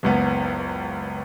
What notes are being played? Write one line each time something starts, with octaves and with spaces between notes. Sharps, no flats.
F#1 C#2 B3